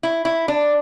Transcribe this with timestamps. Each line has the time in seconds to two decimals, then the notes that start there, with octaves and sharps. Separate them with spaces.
0.03 E4
0.25 E4
0.48 D4